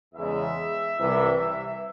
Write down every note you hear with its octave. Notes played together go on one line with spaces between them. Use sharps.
E2 C#3 G#3 E5
C2 C3 E3